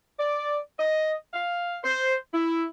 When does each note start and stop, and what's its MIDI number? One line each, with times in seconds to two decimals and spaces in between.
0.20 0.59 74
0.80 1.14 75
1.34 1.79 77
1.84 2.15 72
2.34 2.66 64